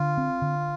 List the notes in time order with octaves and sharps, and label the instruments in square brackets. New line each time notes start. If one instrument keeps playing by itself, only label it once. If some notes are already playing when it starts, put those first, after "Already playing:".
Already playing: [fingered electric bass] D3 [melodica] F4
[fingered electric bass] C4
D3